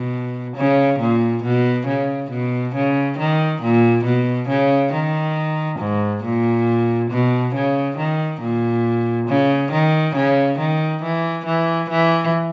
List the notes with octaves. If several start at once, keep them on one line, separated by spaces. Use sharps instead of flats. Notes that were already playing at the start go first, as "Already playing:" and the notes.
Already playing: B2
C#3
A#2
B2
C#3
B2
C#3
D#3
A#2
B2
C#3
D#3
G#2
A#2
B2
C#3
D#3
A#2
C#3
D#3
C#3
D#3
E3
E3
E3